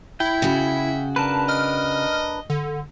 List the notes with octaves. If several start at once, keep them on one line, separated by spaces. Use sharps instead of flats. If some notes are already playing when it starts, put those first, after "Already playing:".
E4 E5 G5
C#3 F#4
D4 A#4 B4 A5
D#5 F6
D3